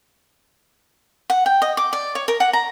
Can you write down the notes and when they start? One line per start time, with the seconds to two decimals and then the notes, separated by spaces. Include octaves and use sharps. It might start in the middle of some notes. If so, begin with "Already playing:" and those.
1.30 F#5
1.46 G5
1.62 D#5
1.77 D6
1.93 D5
2.15 C#5
2.28 A#4
2.40 F#5
2.53 A#5